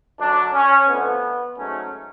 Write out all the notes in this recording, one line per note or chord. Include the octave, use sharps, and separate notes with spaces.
F#2 D3 F#3 D4
C#4
F2 D3 F3 A3 B3
G#2 F#3 A3 C#4